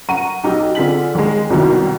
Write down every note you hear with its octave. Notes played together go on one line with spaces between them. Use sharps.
F#5 A#5 C#6 D#7
B1 D#4 G4
D3 C4 F4 G#4 B6 F#7
D#2 G#3
C2 F#2 B2 D#3 E4